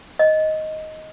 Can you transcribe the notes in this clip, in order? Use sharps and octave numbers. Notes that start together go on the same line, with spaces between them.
D#5